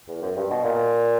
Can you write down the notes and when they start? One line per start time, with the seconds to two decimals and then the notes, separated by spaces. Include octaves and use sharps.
0.08 E2
0.22 F#2
0.36 G2
0.50 B2
0.64 A#2